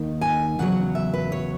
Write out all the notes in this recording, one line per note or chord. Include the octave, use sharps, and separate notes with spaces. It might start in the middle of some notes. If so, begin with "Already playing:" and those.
Already playing: D#2 D#3
G#5
E2 C#3 F#3 F#5
E5
B4
C#5